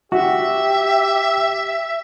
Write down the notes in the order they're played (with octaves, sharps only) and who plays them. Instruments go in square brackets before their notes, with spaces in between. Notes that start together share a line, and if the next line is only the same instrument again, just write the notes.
[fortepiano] F#4 [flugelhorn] G4 [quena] E5